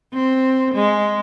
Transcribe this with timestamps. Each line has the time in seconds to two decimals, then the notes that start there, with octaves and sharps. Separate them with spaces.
0.13 C4
0.74 G#3